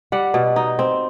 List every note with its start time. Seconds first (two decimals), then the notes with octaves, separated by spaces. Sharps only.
0.12 G3 F#5
0.34 B2
0.56 D#4
0.79 C4